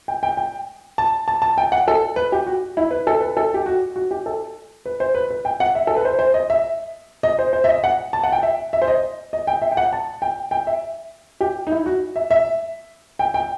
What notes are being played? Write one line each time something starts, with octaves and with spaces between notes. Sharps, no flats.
G5
G5
G5
A5
A5
A5
G5
F#5
A4
B4
G4
F#4
E4
B4
A4
B4
A4
G4
F#4
F#4
G4
A4
B4
C5
B4
B4
G5
F#5
E5
A4
B4
C5
C5
D#5
E5
D#5
C5
C5
E5
D#5
F#5
A5
F#5
G5
E5
E5
C5
D#5
D#5
G5
E5
G5
F#5
A5
G5
G5
E5
G4
D#4
E4
F#4
E5
E5
G5
G5